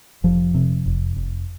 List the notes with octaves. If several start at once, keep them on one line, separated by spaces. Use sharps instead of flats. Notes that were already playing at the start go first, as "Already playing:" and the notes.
F1 F3
C3
F1
F1